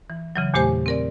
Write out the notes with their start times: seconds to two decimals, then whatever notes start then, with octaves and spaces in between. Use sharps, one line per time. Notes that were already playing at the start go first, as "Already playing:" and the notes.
0.10 E3
0.36 C#3 E3 F#3
0.54 E2 A#2 A3 G4 C5 G#5
0.86 C4 A#4 D5